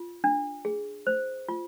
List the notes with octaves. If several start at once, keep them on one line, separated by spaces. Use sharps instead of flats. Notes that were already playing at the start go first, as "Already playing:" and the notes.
Already playing: F4
D4
G#4
C5
F4